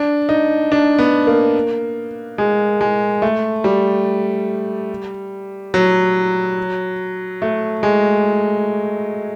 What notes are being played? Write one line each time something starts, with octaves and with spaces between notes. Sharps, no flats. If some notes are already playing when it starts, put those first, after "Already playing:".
Already playing: D4
D#4
D4
B3
A#3
G#3
G#3
A3
G3
F#3
A3
G#3